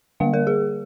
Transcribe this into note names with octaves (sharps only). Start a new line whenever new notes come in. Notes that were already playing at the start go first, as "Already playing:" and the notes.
D3 G3 A#3 F5
A#4
G#4